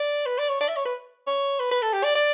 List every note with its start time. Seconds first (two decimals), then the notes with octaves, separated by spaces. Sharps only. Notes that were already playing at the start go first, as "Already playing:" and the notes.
Already playing: D5
0.26 B4
0.38 D5
0.49 C#5
0.61 D5
0.68 E5
0.76 C#5
0.85 B4
1.27 C#5
1.60 B4
1.71 B4
1.82 A4
1.93 G4
2.04 D5
2.15 D5